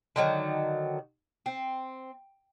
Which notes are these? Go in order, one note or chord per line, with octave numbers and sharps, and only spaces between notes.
D3 D#3 F#3
C4